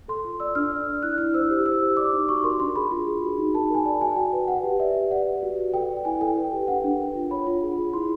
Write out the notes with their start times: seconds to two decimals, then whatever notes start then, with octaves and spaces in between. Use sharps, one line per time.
0.08 A4 C6
0.24 F4
0.40 D5 E6
0.55 D4 F6
0.71 D5
0.87 D5
1.03 E4 F#6
1.18 E4 F6
1.34 C5 E6
1.50 G4
1.66 C5 E6
1.81 G4
1.97 D5 D6
2.13 D#4
2.29 F#4 C#6
2.44 A#4 C6
2.60 D4 C6
2.76 G#4 B5
2.91 F4
3.07 G#4
3.22 F#4
3.38 D#4
3.54 A#4 A5
3.70 A#4 G#5
3.85 D5 A5
4.01 F#4 G#5
4.16 F#4 G5
4.33 B4
4.48 B4 F#5
4.64 G4
4.79 D5 E5
4.95 G4
5.11 D5 F#5
5.27 B4
5.43 F#4
5.58 B4
5.74 A4 G5
5.89 D5
6.05 E4 G#5
6.21 A4 G5
6.36 B4
6.52 G4
6.68 D4 F#5
6.84 D4
6.99 A#4
7.15 F4
7.31 C#5 B5
7.47 F4
7.63 G#4
7.78 G#4
7.93 E4 C6